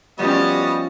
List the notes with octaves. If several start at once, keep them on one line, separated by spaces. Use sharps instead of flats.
F3 G3 B3 C#4 F#4 D#5